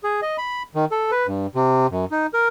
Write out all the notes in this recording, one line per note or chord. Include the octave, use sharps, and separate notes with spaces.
G#4
D#5
B5
D#3
A4
B4
G2
C3
F#2
D#4
A#4